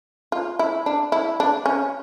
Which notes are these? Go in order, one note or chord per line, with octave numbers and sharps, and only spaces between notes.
F4
E4
D4
E4
D4
C#4